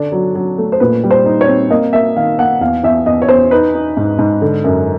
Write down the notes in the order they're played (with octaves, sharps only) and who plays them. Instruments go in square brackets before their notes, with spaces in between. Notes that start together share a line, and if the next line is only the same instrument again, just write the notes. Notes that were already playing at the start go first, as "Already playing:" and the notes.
Already playing: [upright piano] D3 D4
F#3
F#3
A3
C5
A#2 B4
G3
C5
D#4
C#5
C4
A#3 D#5
A#3 E5
D#3 F5
A#3 F#5
E2 F5
E2 E5
E2 D#5
C#5
E2 C5
D#4 B4
D#4
G#2
G#2
D3
F#2